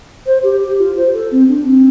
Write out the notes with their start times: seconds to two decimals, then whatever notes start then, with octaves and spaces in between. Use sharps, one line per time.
0.26 C5
0.43 G4
0.61 G4
0.79 F4
0.96 C5
1.13 A4
1.31 C4
1.48 D4
1.65 C4